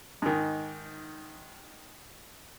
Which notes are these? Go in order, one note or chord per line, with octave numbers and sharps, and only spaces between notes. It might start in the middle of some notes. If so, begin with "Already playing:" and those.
G#2 D#3